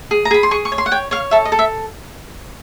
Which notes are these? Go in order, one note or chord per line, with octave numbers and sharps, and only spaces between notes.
G#4
A#5
G#4 B5
C6
G#4 C#6
C#6
C#5
C6
F#5
C#5 G5
C#5 F5
A4 E5
D#5
A4
E5